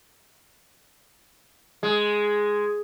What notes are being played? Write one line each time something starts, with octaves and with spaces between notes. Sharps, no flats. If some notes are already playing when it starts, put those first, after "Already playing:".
G#3